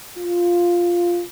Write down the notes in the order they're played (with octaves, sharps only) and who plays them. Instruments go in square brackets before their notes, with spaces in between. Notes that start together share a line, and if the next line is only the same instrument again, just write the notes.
[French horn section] F4